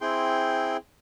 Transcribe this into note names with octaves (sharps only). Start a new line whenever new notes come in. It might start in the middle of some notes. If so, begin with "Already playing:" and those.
C4 E4 G#4 G5 C6